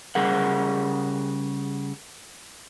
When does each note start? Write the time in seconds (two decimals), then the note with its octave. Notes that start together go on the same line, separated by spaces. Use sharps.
0.15 C#3 G3 G#4 A#4 F#5